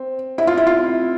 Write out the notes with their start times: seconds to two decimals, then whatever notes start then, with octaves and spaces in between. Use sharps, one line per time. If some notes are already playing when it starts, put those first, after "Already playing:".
Already playing: C4
0.38 E4
0.47 F4
0.57 E4
0.67 F4